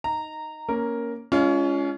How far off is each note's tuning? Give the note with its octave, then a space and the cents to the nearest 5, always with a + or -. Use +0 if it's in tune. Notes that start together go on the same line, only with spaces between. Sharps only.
D#4 +0 A#5 -10
A#3 +0 C#4 +0 A#4 +0
G#3 +0 C#4 +25 F4 -15